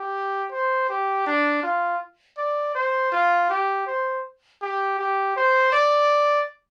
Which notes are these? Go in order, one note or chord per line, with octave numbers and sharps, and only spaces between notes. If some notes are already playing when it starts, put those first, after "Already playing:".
Already playing: G4
C5
G4
D4
F4
D5
C5
F4
G4
C5
G4
G4
C5
D5